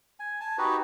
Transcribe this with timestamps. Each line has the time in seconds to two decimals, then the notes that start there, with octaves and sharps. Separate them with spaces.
0.20 G#5
0.40 G#5 A5
0.58 D#4 F#4 G4 B4